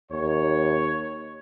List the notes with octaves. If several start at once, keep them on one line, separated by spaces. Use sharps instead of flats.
D#2 C#5